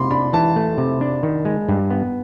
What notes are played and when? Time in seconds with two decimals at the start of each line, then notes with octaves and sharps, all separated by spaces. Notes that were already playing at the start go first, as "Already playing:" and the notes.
Already playing: C3 B5 C6
0.11 D4 B5
0.33 E3 A5
0.56 A3
0.78 C3
1.01 D4
1.23 D#3
1.45 G#3
1.69 G2
1.90 B3